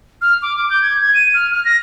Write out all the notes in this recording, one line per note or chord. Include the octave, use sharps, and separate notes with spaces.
F6
D6
D6
G6
G#6
G#6
D#7
F6
F6
A#6